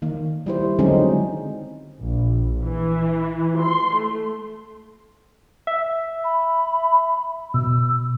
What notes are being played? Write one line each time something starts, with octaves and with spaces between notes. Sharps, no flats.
D#3 A#3
G3 E4 C5
D3 F#3 G#3 C4 C#4 D#4
A#1
E3
C6
A3
E5
B5
B2 E6